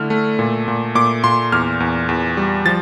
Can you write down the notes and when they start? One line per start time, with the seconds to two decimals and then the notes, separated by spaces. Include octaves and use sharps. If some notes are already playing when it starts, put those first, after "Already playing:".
Already playing: D3 A3 E4 F6
0.10 A3
0.39 A#2
0.68 A#2
0.95 A#2 D6
1.24 A#2 C6
1.52 E2 F6
1.80 E2
2.09 E2
2.37 G3
2.65 F3 A6